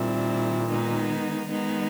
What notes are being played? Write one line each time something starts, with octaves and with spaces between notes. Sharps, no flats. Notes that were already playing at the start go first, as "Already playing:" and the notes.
Already playing: A#2 D#3 G3 C4 E4
D#3 G#3 B3 D#4
D#3 G#3 B3 D#4